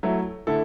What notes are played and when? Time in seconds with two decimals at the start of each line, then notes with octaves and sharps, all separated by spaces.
0.03 F#3 A3 E4
0.47 D3 A3 E4 A4